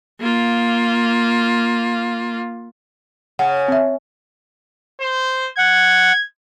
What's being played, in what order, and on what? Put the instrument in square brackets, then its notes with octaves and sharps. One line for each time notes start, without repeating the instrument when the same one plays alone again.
[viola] A#3 F4
[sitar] C#3 [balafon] F#5
[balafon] C4 E5
[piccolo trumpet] C5
[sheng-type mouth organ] F#5 [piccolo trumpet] G#6